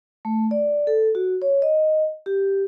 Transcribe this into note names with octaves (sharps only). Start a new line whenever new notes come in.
A3
D5
A4
F#4
C#5
D#5
G4